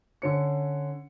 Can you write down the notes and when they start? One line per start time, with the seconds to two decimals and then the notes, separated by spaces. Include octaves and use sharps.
0.22 D3 C#4 C#7